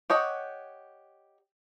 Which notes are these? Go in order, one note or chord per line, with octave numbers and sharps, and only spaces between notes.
G4 C#5 D#5 F#5